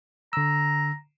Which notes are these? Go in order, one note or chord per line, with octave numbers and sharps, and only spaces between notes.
D3 A#5 E6